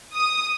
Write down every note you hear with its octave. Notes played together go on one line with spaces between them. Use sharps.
D#6